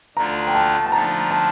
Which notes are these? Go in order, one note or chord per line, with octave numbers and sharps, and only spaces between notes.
D2 D3 A3 D4 F4 A#5
G5
A5
A5
D3 F3 A3 D4 F4 A#5
A5